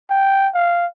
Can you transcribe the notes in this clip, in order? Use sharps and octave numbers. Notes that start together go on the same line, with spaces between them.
G5
F5